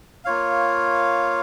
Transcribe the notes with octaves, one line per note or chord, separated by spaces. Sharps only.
A#3 F4 C#5 F5